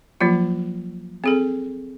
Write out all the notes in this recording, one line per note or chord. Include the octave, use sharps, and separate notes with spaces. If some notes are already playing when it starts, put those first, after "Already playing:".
F3 F#3 A#3 F4
C4 G#4 A4